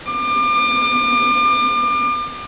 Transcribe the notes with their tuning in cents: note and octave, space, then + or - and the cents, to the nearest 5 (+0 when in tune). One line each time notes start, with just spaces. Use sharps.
D6 +35